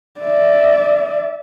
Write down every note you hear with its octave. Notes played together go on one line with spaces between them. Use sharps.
D5 E5